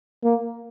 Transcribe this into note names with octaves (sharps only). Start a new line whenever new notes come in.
A#3